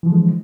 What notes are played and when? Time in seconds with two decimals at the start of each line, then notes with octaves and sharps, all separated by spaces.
0.03 E3
0.06 F3
0.09 D3
0.12 G#3